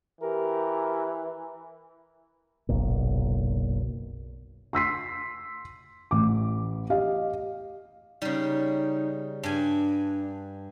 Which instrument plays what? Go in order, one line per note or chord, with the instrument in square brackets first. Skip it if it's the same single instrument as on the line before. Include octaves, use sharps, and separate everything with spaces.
[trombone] E3 [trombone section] G4 A#4
[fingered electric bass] F#1 B1 A#2
[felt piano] C6 E6 B6 C7
A1 D6
G4 D#5 F5
[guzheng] C#3 G3 [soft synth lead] D#4
[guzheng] G2 G#5 [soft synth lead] D4